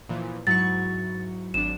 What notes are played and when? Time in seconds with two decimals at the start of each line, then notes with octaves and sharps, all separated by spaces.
0.09 A#2 E3 F3
0.47 G#2 F#3 E4 C#6 A6
1.54 G#1 D4 E7